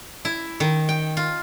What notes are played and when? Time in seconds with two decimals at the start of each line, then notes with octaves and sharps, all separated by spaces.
0.25 E4
0.60 D#3
0.89 G5
1.17 F4